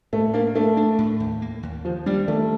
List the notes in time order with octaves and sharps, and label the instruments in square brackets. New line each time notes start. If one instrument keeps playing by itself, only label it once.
[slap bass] A2 [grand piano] A3
[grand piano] A#3 [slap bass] D4
[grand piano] A3 [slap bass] D4
[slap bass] D4
A2
D#2
A#3
D#2
[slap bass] D#3 [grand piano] F3
[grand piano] G3 [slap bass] D4
[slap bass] D#3 [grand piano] A3